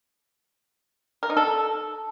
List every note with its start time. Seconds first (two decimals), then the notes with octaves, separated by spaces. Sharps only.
1.23 A#4
1.30 D#4
1.37 A4